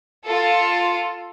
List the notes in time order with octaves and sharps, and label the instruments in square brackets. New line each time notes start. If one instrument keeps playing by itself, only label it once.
[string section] F4 A4